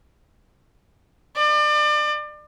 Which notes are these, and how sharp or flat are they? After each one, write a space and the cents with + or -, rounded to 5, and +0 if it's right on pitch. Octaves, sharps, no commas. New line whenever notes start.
D5 +35